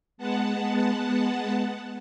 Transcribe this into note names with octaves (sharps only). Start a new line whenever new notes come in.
G#3 B3 F#5 A5